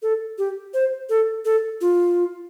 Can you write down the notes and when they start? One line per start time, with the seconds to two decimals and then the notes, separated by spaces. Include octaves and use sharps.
0.02 A4
0.38 G4
0.74 C5
1.09 A4
1.45 A4
1.81 F4